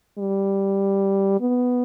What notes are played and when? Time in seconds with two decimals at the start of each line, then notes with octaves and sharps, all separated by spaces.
0.18 G3
1.41 B3